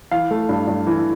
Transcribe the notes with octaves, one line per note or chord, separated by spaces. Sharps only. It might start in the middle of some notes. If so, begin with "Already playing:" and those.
E3 F5
A3
G2
G2
E3